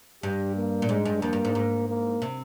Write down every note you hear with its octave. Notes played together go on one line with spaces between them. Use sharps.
G2 G4
A#3
A#2
G#2 G#3
G2
F2 A#3
G2
G#2
G#2
A#3
C3